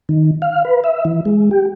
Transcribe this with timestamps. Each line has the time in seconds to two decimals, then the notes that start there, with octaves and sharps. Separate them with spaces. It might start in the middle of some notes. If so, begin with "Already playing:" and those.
0.09 D#3
0.42 F5
0.65 B4
0.84 E5
1.05 E3
1.25 G#3
1.51 G4